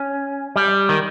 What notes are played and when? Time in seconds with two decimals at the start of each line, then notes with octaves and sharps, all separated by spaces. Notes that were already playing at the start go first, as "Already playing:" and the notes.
Already playing: C#4
0.56 G3
0.89 D#3